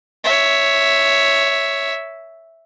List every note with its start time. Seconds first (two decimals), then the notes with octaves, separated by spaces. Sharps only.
0.24 C#5 E5